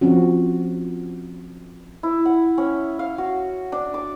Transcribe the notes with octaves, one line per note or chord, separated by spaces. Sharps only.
F3 C4 C#4 F#4
E4
F#5
C#4
F5
F#4
D4
D6